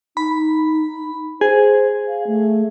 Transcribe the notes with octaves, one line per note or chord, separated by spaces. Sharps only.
D#4 B5
G#4 C5
F5
A3